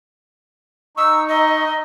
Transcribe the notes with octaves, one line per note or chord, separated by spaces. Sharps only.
D#4 C#6 E6
D#5